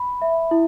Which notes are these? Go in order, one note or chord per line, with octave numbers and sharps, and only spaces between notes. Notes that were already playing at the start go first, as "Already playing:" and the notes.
Already playing: B5
E5
E4